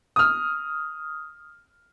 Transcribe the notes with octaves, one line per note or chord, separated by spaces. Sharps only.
D#6 F6